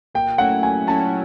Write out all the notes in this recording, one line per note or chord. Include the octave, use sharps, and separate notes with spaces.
A#2 G5
F#3 A3 C#4 E4 F#5
A#2 G#5
F#3 A3 C#4 E4 A5